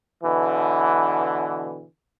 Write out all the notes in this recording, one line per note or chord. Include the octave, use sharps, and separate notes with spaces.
B2 D3 E3